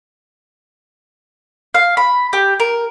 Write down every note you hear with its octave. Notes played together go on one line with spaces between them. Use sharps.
F5
B5
G4
A#4